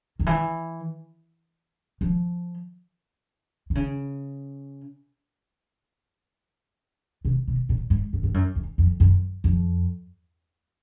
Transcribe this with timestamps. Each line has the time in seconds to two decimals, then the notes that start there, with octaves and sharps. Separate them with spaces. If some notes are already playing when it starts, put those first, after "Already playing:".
0.19 D#3
0.26 E3
2.01 F3
3.70 D3
3.75 C#3
7.25 C3
7.48 B2
7.69 A#2
7.90 G#2
8.13 G2
8.23 G2
8.34 F#2
8.55 E2
8.78 F2
9.00 F#2
9.44 F2